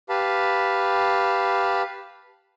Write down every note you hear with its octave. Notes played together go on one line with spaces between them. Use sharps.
G4 B4 F5 A5 B5